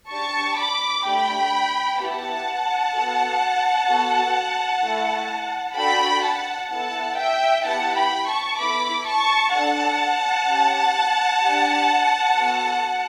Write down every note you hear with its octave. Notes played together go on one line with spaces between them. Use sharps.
D4 G4 A5 C#6
B5 D6
A3 D4 G4 G5 B5
B3 E4 G4 F#5 A5
B3 F#4 A4
B3 F#4 A4
A3 E4 A4
D4 F#4 A4 G5 B5
F#5 A5
B3 E4 A4 F#5 A5
E5 G5
B3 E4 G4 F#5 A5
G5 B5
A5 C#6
B3 E4 A4 B5 D6
A5 C#6
D4 A4 F#5 A5
C#4 G4
D4 G4
B3 F#4 A4